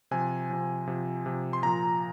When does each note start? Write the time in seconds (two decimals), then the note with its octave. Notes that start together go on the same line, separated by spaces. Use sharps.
0.11 C3 F3 G#5
0.50 C3 F3
0.87 C3 F3
1.26 C3 F3
1.53 C6
1.63 A#2 F3 A#5